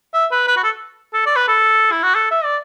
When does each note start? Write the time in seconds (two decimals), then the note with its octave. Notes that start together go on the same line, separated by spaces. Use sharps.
0.14 E5
0.31 B4
0.47 B4
0.56 F#4
0.64 A4
1.14 A4
1.26 D5
1.36 B4
1.48 A4
1.92 E4
2.03 F#4
2.15 A4
2.31 E5
2.44 D5